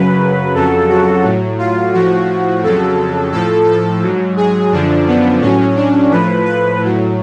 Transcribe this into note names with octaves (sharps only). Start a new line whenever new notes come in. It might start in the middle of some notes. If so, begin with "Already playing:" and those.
Already playing: F#2 C#3 F#3 B4
F2 C#3 F#3 A4
F#4
A2 F#3
F4
A2 F3 F#4
F2 C#3 F#3 A4
A2 F3 A4
A4
G#2 F#3
G#4
F#2 D3 F3 D4
B3
A2 F#3 C#4
D4
A2 F3 B4
B4
A2 F#3